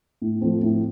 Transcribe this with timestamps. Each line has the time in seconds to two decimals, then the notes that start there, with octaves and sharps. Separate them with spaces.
0.22 A2
0.41 F3 A3 C4
0.63 A2